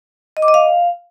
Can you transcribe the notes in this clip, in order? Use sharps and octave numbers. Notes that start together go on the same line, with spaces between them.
D#5
D6
D#5
F5